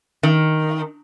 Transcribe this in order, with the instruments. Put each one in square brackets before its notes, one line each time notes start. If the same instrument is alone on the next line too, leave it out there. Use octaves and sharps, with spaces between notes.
[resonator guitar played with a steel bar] D#3